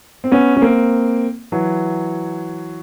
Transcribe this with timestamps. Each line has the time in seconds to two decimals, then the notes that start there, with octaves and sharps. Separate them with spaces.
0.24 C4
0.32 B3 C#4
0.57 C#4
0.62 A#3 C4
1.52 E3 F#3